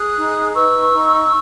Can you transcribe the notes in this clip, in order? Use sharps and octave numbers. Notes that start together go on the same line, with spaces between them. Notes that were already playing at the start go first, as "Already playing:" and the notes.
Already playing: G#4 D#6 F#6
D#4
B4 C#6 E6
D#4